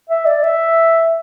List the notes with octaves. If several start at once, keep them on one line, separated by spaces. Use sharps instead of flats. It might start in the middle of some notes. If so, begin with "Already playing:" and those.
E5
D5
E5